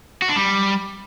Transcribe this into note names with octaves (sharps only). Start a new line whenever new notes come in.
F#4
D4
G3